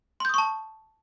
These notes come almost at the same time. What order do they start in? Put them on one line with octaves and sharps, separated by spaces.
C6 G6 D#6 C#6 A5